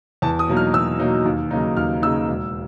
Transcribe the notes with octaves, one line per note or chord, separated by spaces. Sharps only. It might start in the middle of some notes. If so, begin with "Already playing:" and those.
E2 A5
D#6
B2 F#3 A#3 D#4
F6
E2 E6
B2 F#3 A#3 D#4
D#2
C#3 F#3 A#3 D#4
D#2 F6
C#3 F#3 A#3 D#4 E6
E1